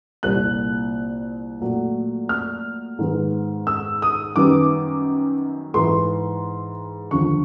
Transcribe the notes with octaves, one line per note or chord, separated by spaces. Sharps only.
C2 A#2 G3 A#3 F#6
A#2 F#3 A3
F6
G#2 D#3 G#3 B3
E6
D#6
F#2 D#3 G3 B3 D6
G#2 E3 G#3 C6
D#2 D3 F3 C#6